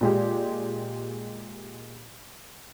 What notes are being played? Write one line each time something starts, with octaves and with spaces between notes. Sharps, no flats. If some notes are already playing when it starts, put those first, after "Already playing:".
A#2 G#3 G4